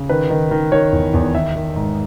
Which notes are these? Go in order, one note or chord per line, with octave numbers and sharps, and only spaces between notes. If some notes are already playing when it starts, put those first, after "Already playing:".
Already playing: C#3
D#3 B4
D#3
D#3
D#3 C#5
E2
E2
D#3 E5
D#3
G#2